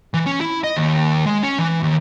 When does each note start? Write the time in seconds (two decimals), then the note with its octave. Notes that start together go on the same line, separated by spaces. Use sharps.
0.14 E3
0.26 C#4
0.41 E4
0.64 D#5
0.76 D#2
1.26 G#3
1.42 C#4
1.59 E3
1.83 D#2